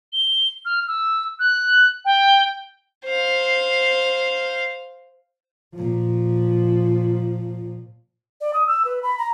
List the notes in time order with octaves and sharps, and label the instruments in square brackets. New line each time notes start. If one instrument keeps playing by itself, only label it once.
[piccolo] G7
F6
E6
F#6
G5
[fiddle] C5 F5
[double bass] A#2 F3
[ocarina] D5
D#6
E6
B4
B5
A#5